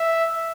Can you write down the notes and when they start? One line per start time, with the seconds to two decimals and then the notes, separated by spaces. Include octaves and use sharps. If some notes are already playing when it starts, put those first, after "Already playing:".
Already playing: E5